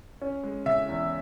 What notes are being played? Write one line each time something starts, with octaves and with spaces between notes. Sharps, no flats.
C#4
G#3
C#3 E5
E2